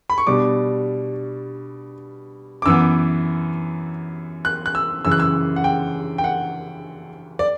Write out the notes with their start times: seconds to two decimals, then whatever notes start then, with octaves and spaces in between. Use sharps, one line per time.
0.10 B5
0.18 C#6
0.27 B2 G3 D4 D6
2.62 D6
2.66 F#2 E3 B3 E6
4.45 F#6
4.66 F#6
4.75 E6
5.05 F#2 C#3 E3 E6
5.12 F#6
5.20 E6
5.56 F#5
5.64 G5
6.18 G5
6.24 F#5
7.39 D5